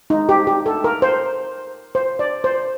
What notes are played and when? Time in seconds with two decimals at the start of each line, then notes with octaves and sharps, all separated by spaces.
0.10 D#4
0.29 G4
0.47 G4
0.66 A4
0.84 A#4
1.02 C5
1.95 C5
2.19 D5
2.44 C5